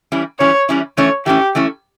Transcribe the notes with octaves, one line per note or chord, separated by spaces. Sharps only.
E3 G3 C#4 E4
E3 G3 C#4 E4 C#5
E3 G3 C#4 E4
E3 A3 C#4 E4 C#5
E3 A3 C#4 E4 G4
E3 A3 C#4 E4